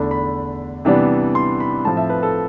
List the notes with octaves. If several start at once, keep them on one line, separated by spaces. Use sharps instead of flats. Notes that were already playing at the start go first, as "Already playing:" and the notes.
Already playing: E2 D3 A3 D4 B5
B5
C3 E3 G3 B3 D4
C6
B5
A2 F3 C4 A5
E5
B4
A4